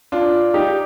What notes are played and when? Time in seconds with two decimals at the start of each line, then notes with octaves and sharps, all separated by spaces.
0.12 D4 F4
0.54 D#4 G4